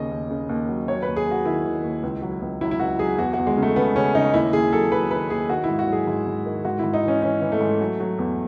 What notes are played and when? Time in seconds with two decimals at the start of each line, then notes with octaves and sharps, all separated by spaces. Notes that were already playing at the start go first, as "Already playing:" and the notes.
Already playing: D#2 C#3 D#5
0.11 D#2
0.31 C#3
0.49 D#2
0.68 F#3
0.88 F#3 C#5
1.02 D#2 B4
1.17 G#4
1.26 F#3
1.31 F#4
1.45 D#3 E4
1.65 D#3
1.84 D#2
2.03 C#2
2.22 F#3
2.42 C#2
2.61 F#3 E4
2.71 E4
2.80 C#2 F#4
2.99 F#3 G#4
3.18 E2 F#4
3.33 E2 F#4
3.47 G#3
3.57 C#3
3.62 A3
3.76 C#3 B3
3.95 C#3 C#4
4.15 C#3 D#4
4.34 D#2 E4
4.53 D#2 G#4
4.72 F#3 A4
4.91 F#3 B4
5.11 D#3 B4
5.30 D#2 G#4
5.49 D#3 F#4
5.64 G#2 E4
5.79 F#4
5.87 F#3 G#4
6.07 G#2
6.27 G#2
6.46 D#3
6.65 G#2 F#4
6.79 G#2 E4
6.94 D#4
7.03 E3 C#4
7.22 E3 C#4
7.41 E3
7.52 A3
7.61 G#2
7.81 F#3
8.00 F#3
8.18 E2